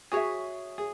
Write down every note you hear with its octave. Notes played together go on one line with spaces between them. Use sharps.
F#4 G#4 C#5 E5
G#4